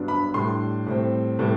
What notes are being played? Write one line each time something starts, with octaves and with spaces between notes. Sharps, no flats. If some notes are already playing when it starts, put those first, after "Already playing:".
Already playing: G2 F#3 B3 D4
B5
A2 G3 D4 C6
A2 G3 C4
A2 G3 B3